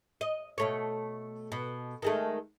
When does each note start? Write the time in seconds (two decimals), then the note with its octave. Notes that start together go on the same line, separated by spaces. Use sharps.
0.21 D#5
0.58 B2 A3 C#5
1.52 B2
2.02 D#3 G#3 A3